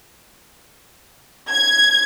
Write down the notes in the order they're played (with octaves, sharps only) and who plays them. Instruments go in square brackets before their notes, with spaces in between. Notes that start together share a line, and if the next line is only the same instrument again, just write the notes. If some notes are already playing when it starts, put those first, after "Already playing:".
[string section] G#6